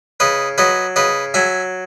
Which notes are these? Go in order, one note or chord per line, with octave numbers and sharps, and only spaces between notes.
C#3 B4 D#5
F#3 B4 D#5
C#3 B4 D#5
F#3 E5 G#5